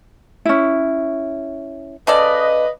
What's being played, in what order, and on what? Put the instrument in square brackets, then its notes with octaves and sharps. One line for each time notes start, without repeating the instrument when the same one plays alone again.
[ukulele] C#4 E4
[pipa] C#3 A4 D5 [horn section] B4 D#5